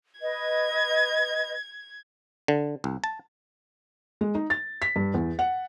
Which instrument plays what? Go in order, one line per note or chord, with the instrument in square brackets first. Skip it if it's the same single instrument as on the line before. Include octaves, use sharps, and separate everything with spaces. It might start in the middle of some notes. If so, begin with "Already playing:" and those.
[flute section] B4 D#5 [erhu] G#6
[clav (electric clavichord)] D3
C2
A5
[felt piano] G#3
D#4
A6
B6
G2
E2
F#5